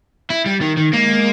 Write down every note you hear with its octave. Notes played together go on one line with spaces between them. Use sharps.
E4
G3
D#3
D#3
G#3 A#3